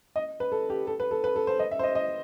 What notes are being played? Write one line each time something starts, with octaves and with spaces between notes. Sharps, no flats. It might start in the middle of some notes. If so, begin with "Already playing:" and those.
D#5
B4
A4
G4
A4
B4
A4
B4
A4
C5
D#5
E5
C5
D#5
D#5